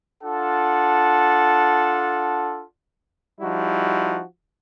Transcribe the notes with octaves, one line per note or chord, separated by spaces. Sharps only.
D4 F4 A4 F#5 A5
F3 G3 D#4 E4 F#4